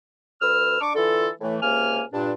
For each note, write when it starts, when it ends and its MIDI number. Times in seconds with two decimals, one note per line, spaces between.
0.41 0.78 38
0.41 0.78 71
0.41 0.78 88
0.41 0.78 89
0.81 0.95 62
0.81 0.95 85
0.81 0.95 86
0.95 1.29 50
0.95 1.29 52
0.95 1.29 65
0.95 1.29 69
1.41 1.57 45
1.41 1.57 52
1.41 1.57 57
1.62 2.02 37
1.62 2.02 48
1.62 2.02 58
1.62 2.02 80
1.62 2.02 89
2.13 2.33 43
2.13 2.33 46
2.13 2.33 62